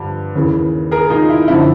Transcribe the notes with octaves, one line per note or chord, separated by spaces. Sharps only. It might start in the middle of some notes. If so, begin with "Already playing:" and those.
Already playing: G2 D3 F3
D#2 C#3 E3
G#4 A#4
D#4 F4
E4
F#2 D3 F3 E4